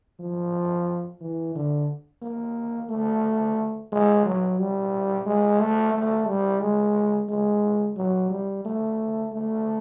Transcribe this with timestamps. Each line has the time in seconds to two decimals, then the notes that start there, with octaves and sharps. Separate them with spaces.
0.20 F3
1.21 E3
1.55 D3
2.22 A#3
2.90 A3
3.92 G#3
4.26 F#3
4.59 G3
5.26 G#3
5.60 A3
5.94 A3
6.28 G3
6.61 G#3
7.29 G#3
7.97 F#3
8.30 G3
8.65 A3
9.33 A3